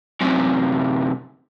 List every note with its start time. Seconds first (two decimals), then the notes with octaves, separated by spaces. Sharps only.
0.21 F#2 C3